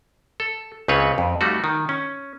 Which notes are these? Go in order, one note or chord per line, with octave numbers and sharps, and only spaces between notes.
A4
C#2 C#3 C4 B4 C#5
F2
G3 A3 D#4 F#4
D#3
C#4